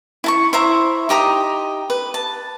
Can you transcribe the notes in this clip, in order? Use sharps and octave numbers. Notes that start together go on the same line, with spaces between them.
E4 A5 C#6
E4 C5 E5 A#5
D#4 G4 A#5 D#6
B4
A5